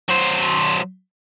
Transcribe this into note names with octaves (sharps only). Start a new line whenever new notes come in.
F#3 C5